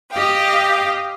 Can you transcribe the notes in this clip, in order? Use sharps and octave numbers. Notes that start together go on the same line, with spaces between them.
G4 D#5 F5 G5